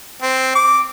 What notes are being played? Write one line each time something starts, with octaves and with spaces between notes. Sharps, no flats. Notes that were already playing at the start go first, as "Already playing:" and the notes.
C4
D6